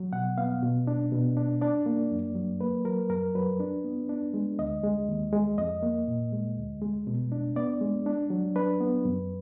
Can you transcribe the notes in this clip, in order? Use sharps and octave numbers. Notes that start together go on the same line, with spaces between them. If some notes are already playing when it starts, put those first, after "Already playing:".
Already playing: F#3
B2 F#5
B3 F5
B2
D4
B2
D4
D4 D5
A#3
F#2
F#3
A#3 B4
F#3 A#4
F#2 A#4
F#3 B4
D4
B3
D4
G#3
D2 D#5
G#3
D#2
G#3
F2 D#5
A#3
A#2
G#3
D2
G#3
B2
D4
B3 D5
G#3
D4
F#3
D4 B4
B3
F#2